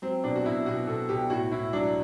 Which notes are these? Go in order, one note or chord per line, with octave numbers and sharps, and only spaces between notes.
F#3 C4
B2 D4
F#4
B2 E4
B2 F#4
B2 A4
B2 G4
A2 F#4
A2 E4
F#3 D4